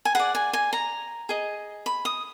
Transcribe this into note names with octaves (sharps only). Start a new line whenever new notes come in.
G#5
G#4 D5 F#5
G#5
G#5
A#5
G#4 D#5
B5
D#6